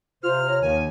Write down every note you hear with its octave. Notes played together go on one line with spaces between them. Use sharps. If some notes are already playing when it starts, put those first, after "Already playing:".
C3 F4 C5 F6
C#5 A#5
D#2 D#3 G#5